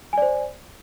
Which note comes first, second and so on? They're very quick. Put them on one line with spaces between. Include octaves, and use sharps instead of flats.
G#5 D5 C5